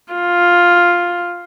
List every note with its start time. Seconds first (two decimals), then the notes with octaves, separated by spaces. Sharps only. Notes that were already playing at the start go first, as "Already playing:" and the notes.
0.13 F4